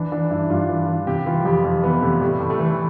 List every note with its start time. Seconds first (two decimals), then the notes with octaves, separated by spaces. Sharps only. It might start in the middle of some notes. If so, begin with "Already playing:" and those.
Already playing: E3 D4
0.12 E3 D4
0.30 G2 E4
0.50 G2 F4
0.69 E3
0.88 E3
1.07 C3 G4
1.26 E3 F4
1.45 F2 G4
1.64 F2 G4
1.83 E3 B3
2.02 C3 A3
2.21 A2 G3
2.40 A2
2.50 A3
2.59 E3